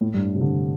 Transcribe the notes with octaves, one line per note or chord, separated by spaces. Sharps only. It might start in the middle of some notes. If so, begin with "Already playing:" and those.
A2
G2
C3
D3